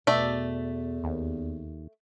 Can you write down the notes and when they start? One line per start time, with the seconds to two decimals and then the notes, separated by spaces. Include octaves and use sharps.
0.07 E2 B2 A3 D5 E5
1.04 D#2